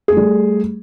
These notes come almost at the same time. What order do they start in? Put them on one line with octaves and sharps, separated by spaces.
G#4 A3 G3